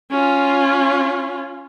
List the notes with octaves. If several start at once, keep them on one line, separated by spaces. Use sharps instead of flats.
C#4 F4